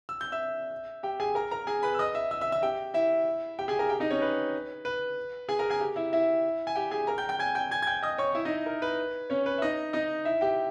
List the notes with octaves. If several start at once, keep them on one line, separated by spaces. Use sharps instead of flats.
E6
G6
E5 E6
G4 G5
G#4 G#5
A#4 A#5
A#4 A#5
G#4 G#5
B4 B5
E6
D#5 D#6
E5 E6
E5 E6
E5 E6
E5 E6
G4 G5
E4 E5
G4 G5
G#4 G#5
A#4 A#5
G4 G5
D#4 D#5
C#4 C#5
B4
B4
G#4 G#5
A#4 A#5
G#4 G#5
G4 G5
E4 E5
E4 E5
G#5
G4 G5
G#4 G#5
A#4 A#5
G5 G6
G5 G6
G#5 G#6
G5 G6
G#5 G#6
G#6
G5 G6
D#5 D#6
C#5 C#6
E4 E5
D#4 D#5
A#4
B4
C#4 C#5
B4
E5
D#4 D#5
D#4 D#5
E4 E5
G4 G5